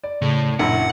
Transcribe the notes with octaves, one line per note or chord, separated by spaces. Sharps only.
D5
A2 C#3
A#1 F#2 D4 E4 F#5